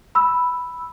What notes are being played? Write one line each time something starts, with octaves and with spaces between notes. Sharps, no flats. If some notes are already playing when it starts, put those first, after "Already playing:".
B5 E6